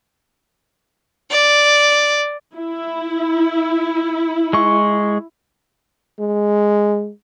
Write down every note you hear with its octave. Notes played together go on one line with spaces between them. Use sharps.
D5
E4
G#3 C#6
G#3